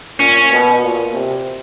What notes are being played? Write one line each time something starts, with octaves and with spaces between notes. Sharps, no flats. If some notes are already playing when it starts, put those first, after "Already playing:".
A#2 C#4
B2
A#2
C3